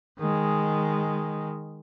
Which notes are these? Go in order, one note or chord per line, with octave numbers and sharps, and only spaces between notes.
D#3 G#3